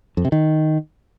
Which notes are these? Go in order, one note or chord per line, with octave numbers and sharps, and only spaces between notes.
F2
C3
D#3